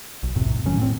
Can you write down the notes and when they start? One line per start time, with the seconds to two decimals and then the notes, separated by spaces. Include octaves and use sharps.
0.23 B1
0.35 B1 F2 A2 C3
0.65 A2 D#3 F#3 C#4
0.77 A2 B3 C4